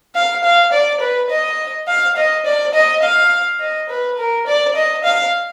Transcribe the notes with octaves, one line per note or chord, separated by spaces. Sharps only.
F5
F5
D5
B4
D#5
F5
D#5
D5
D#5
F5
D#5
B4
A#4
D5
D#5
F5